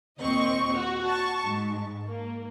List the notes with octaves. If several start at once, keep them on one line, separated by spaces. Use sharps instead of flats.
D#2 A#2 C4 D#5 C#6
F#4
A5 C#6
G#2
A#3